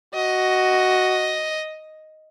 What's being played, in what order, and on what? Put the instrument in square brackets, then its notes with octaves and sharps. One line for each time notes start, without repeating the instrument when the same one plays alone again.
[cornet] F#4 [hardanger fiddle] D#5